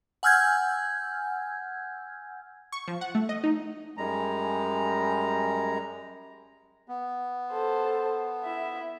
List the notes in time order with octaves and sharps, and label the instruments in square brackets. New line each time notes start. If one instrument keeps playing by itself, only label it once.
[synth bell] F#5 G#5 E6 F6 G6 G#6
[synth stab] C#6
F3
F#5
A3
D#5
D#4
[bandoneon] F#2 G3 G#3 A#5
[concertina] B3
[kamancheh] A4 C5
E4 E5